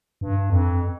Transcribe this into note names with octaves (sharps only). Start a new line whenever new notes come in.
G2
F2